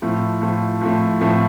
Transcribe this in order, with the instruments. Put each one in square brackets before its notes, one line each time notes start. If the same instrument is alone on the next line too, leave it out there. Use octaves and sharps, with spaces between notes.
[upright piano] A2 F3 A3
A2 F3 A3
A2 F3 A3
A2 F3 A3